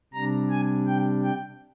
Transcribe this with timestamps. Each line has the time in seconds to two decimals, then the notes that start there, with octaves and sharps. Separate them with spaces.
0.13 C3 G3 D4 A#5
0.50 G#5
0.87 G5
1.23 G5